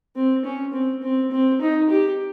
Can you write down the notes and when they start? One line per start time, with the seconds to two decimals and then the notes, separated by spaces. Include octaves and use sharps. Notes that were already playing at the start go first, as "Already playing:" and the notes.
0.16 C4
0.45 C#4
0.73 C4
1.03 C4
1.31 C4
1.61 D#4
1.89 G4